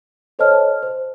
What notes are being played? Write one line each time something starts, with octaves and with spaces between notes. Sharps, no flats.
A4 C5 C#5 D#5 A5 F6
C5